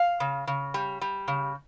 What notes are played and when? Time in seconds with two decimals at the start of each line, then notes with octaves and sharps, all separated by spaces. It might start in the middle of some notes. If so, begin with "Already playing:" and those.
Already playing: F5
0.20 C#3
0.47 C#3
0.74 G3
1.01 G3
1.28 C#3